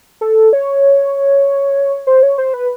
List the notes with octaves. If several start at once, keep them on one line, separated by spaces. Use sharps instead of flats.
A4
C#5
C5
C#5
C5
B4